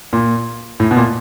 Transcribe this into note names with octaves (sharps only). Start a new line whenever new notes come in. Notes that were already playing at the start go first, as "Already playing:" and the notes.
A#2
A2
B2
A#2